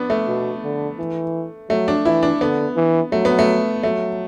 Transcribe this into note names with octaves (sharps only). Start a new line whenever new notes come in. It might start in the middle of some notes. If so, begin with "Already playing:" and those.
Already playing: B3 D4
A3
B2
D3
E3
F#3 A3
D4
E3 E4
D4
D3 B3
E3
F#3 A3
B3
A3
F#3 A3